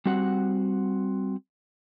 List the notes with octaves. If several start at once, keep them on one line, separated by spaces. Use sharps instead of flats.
G3 C4 F#4 F#5